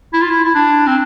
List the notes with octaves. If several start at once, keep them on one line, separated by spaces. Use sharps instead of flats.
E4
F4
E4
E4
D4
C4